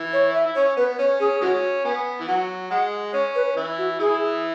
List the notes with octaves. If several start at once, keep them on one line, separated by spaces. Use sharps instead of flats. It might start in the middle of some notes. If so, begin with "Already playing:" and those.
Already playing: E3 E4
C#5
E5
E4
C#4 C#5
B3 B4
C#4 C#5
C#4 G#4
E3 G#3 C#4 F#4
B3 G#5
E3
F#3 F#5
G#3 F#5
C#4 C#5
B4
E3 E4
F#4
E3 E4 G#4